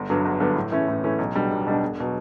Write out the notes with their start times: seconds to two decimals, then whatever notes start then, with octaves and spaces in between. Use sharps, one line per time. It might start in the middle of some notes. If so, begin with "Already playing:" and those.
Already playing: G1
0.10 G2 D3 F#3 B3
0.25 G1
0.40 G2 D3 F#3 B3
0.56 A2
0.72 E3 A3 C#4
0.88 A2
1.04 E3 A3 C#4
1.19 B1
1.35 B2 G3 D4
1.51 B1
1.67 B2 G3 D4
1.82 E1
2.00 B2 F#3